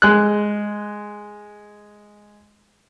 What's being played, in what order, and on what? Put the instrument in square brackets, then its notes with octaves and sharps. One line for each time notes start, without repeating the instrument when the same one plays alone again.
[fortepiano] G#3 F#6